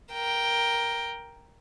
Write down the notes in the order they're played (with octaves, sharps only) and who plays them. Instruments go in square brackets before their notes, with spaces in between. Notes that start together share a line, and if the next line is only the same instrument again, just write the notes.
[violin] A#4 G5